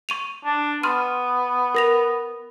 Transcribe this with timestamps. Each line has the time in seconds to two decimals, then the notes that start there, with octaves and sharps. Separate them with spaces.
0.09 C#6 D#7 F7
0.45 D4
0.83 B3 C6 F6 D#7
1.75 A#4 A#6 F7